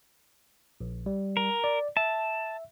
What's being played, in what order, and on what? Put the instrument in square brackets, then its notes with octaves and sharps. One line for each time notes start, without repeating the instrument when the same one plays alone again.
[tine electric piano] A#1
G3
[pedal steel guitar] A#4
[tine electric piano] D5
[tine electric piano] E5 [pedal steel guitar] A5